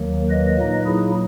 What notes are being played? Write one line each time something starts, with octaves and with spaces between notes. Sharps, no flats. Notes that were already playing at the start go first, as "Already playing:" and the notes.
Already playing: D#2 D#3 F#3 A#3
B4 D#5
A#2 F#3 A#3 D#4
E4 G#4